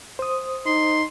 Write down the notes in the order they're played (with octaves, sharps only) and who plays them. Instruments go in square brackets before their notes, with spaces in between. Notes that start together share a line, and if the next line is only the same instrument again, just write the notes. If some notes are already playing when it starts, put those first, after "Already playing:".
[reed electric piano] C5 D#6
[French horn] D#4 [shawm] C6